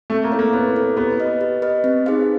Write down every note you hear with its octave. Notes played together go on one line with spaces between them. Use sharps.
A3 C4
A#3
E4 A4 C#5
A#3
B3 C4
E4 A4 C#5
B3 G4
B4 D#5
G4
B4 D#5
C4
D#4 G#4 C5 F5